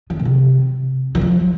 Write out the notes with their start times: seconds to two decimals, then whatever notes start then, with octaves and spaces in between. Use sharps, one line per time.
0.10 D#3
0.19 A#2
0.25 C3
1.15 D#3
1.21 F3